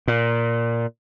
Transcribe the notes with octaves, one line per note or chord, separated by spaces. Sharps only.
A#2